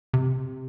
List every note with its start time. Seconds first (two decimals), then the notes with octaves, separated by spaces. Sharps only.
0.14 C3